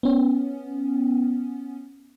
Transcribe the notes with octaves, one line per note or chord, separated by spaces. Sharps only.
B3 C#4